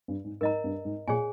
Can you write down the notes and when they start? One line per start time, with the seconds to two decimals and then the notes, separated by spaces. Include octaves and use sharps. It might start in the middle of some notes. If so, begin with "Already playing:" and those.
0.08 G2
0.24 G#2
0.41 G#2 A#4 D#5 A#5
0.64 G2
0.85 G#2
1.08 A#2 G#4 C#5 G#5